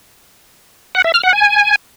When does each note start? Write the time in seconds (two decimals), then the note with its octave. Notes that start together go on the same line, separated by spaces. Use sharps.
0.95 F#5
1.04 E5
1.14 F6
1.23 F#5
1.33 G#5